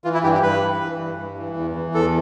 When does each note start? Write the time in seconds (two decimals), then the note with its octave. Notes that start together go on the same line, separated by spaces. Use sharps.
0.04 E3 F4
0.14 E4
0.23 G2 G4
0.34 G4
0.42 G2 B4
0.61 E3
0.80 E3
0.99 G2
1.19 G2
1.37 E3
1.56 E2
1.75 E3
1.94 E2 A4